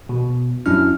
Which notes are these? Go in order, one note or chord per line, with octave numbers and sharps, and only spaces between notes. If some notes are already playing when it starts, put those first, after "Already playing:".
B2
F#2 F#3 C#4 D4 E4 F6